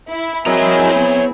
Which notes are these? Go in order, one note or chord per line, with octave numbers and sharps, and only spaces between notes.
E4
C4 E4 F#4 G#4 A#4 C#5 D#5 A#5
B3